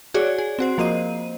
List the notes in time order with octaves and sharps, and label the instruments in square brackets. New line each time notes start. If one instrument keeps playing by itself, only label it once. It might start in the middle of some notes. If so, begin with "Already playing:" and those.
[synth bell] F#4 G#4 C#5 D5
G#4
C4 F#4 C5
F3 A#3 C5 D#5 D#7